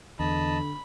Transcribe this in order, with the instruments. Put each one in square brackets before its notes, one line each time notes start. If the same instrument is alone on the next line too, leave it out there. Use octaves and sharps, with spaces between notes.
[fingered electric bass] E2 [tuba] D3 [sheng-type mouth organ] D#5 A5 [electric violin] B5